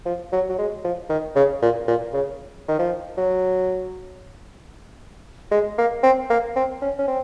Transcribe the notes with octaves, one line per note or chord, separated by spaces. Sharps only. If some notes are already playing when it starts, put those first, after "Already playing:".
F3
F#3
F#3
G#3
F3
D#3
C#3
A#2
A#2
C#3
D#3
F3
F#3
G#3
A#3
C4
A#3
C4
C#4
C#4
C4